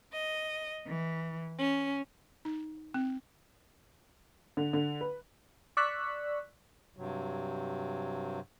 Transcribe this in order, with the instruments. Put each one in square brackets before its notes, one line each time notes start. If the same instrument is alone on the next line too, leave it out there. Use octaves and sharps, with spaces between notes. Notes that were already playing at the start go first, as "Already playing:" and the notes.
[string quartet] D#5
E3
C#4
[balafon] D#4
C4
[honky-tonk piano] D3
D3
B4
[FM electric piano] D5 C#6 E6 F#6 B6
[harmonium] G2 C3 F#3